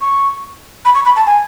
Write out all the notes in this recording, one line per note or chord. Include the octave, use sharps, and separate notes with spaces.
C#6
B5
C#6
B5
A5
G#5